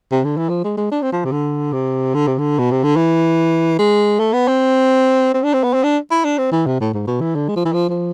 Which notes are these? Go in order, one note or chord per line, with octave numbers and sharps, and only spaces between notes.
C3
D3
E3
F3
G#3
G#3
D4
C4
F3
C3
D3
C3
D3
C3
D3
B2
C3
D3
E3
G#3
A3
B3
C4
C4
D4
C4
B3
C4
D4
E4
D4
C4
E3
C3
A2
G#2
B2
E3
D3
G#3
F3
E3
F3
F3